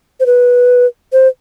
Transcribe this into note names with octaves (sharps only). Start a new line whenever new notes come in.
C5
B4
C5